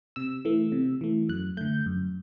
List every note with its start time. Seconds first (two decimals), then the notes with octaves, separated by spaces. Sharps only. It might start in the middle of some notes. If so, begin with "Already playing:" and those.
0.16 C3 E6
0.45 E3 A3
0.72 C3
1.01 E3 A3
1.29 F#2 F#6
1.57 D3 A3 G6
1.86 F#2